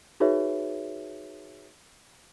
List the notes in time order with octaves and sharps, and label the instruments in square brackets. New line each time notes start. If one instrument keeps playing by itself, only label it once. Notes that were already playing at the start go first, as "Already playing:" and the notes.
[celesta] D#4 F#4 G#4 B4 C#5 E5